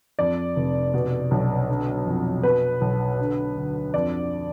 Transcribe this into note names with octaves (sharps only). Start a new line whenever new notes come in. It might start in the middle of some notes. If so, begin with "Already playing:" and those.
F2 D5
F1
B2
B1
D3
F2
B2 B4
B1
D3
D2
F2 D5